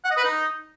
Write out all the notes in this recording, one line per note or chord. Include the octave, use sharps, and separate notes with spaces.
F#5
D#5
B4
D#4